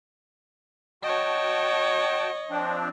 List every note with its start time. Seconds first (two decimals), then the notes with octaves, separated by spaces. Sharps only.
1.03 F#4 C#5 D#5 G5 A5
2.50 F3 C4 D4